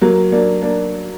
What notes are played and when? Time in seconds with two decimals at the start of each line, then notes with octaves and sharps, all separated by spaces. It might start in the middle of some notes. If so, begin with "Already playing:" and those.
0.01 F#3 A#3
0.32 A#3 D4
0.62 A#3 D4